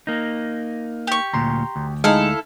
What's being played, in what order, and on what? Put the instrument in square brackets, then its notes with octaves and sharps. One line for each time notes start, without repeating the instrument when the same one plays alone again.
[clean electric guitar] A#3 D#4
[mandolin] G4 C#6
[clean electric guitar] D2 A#2 [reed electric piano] A#5 C6
[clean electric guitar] D2
[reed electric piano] G#3 D#4 [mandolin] E4 A4 F5